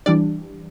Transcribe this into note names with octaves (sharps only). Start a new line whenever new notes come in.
E3 G3 D4 D5